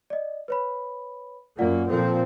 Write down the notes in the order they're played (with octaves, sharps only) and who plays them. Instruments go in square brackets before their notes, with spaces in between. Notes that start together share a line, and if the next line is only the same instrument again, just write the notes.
[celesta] D5 D#5
B4 C#5 B5
[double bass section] F#2 A#3 [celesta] F4 D5 F#5
[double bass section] A#2 F3 C4 [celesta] A4